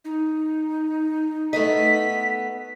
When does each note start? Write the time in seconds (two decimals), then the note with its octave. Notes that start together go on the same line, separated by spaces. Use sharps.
0.05 D#4
1.53 A3 B3 D#5 B6